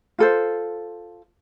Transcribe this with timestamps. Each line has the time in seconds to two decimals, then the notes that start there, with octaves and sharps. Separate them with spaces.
0.19 F4 A4 C5